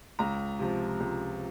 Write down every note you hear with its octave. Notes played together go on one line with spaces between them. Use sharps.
C#2 A#5
C3 F3
C#2